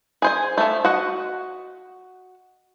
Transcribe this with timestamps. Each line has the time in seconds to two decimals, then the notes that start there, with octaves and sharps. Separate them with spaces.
0.22 G#4 C5 G#5
0.58 F3 A3
0.84 F#4 D#5 F#5